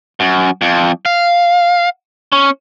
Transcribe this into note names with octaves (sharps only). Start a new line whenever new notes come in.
F#2
F2
F5
C#4